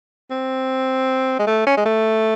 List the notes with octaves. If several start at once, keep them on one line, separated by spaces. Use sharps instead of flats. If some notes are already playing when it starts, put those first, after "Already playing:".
C4
G#3
A3
C#4
G#3
A3